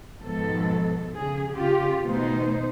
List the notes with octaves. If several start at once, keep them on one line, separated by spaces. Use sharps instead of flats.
G#2 B2 D#3 F3 A4
C#3 G#4
C#3 F4 G4
B2 D#3 A3 D#4 C5